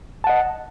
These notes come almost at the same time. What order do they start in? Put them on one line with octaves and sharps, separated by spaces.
A5 F#5 D#5